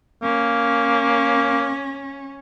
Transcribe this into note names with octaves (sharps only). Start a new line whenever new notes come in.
A#3 C#4